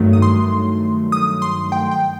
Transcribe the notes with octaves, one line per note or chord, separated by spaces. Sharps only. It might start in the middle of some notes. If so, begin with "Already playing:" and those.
Already playing: G2 D#3 F#3 A3
D#6
C6
D#6
C6
G5
G5